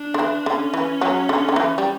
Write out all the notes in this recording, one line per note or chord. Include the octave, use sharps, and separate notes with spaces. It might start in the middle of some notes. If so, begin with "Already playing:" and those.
Already playing: D4
D3
E3
D3 C#4
E3
F#3
D3
D3
E3
G3